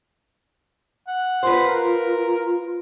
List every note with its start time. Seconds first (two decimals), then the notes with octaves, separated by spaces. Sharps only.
1.07 F#5
1.43 F4 B4 C5
1.67 A#4